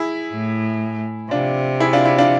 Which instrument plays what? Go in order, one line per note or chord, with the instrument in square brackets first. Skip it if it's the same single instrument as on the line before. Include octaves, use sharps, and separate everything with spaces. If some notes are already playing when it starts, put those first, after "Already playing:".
Already playing: [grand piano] E4 G#4
[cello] A2
[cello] C3 [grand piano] D4 F4
[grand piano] E4 G#4
D4 F4
E4
D4 F4